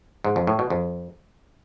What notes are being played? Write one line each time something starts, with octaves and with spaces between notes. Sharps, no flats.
G#2
F2
A2
B2
F2